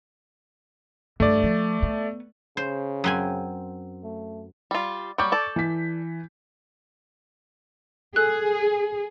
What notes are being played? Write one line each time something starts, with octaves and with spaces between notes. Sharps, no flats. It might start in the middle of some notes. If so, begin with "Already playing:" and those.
G2 A3 D5
F3
B3
C#3 C5
F#2 C4 G#5
A3
G3 F4
F#3 G3 C#6 D6 G6
A4 D5
E3 B6
G#4 A4 F#6